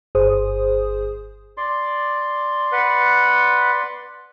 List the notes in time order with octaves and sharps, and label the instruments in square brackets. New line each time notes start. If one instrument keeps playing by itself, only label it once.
[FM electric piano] G1 G#4 C5 D#6
[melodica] D5 C6
[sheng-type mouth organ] B4 F#5